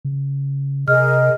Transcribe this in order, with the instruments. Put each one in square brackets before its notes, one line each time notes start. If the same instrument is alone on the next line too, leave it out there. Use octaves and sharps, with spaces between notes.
[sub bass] C#3
[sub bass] C3 [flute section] G#4 A#4 D#5 [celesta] F6